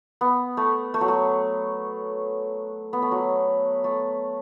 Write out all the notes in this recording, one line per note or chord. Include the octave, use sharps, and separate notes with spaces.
B3
A3
A3
F#3
A3
B3
A3
F#3
A3